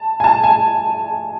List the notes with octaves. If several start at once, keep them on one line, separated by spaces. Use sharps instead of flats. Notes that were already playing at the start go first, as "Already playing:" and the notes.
Already playing: A5
G#5
A5
G#5